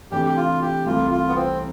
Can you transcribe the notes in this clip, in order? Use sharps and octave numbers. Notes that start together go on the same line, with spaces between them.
C3 E3 A3 D4 G4
G4
F4
G4
C2 C3 E3 A3 F4
F4
B3
C4